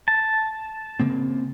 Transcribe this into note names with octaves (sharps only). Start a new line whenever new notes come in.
A5
C#3 A#3 C4